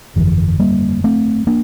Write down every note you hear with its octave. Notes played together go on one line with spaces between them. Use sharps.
G1 F2 D3 E3
G3 A#3
A3 C4
A#3 D4